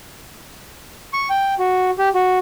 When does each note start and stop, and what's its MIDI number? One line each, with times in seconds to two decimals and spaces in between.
1.13 1.28 85
1.30 1.54 79
1.59 1.90 66
1.99 2.09 67
2.15 2.39 66